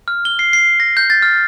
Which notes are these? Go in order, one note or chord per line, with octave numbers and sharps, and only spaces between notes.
F6
G7
C7
C7
A#6
G6
A6
F6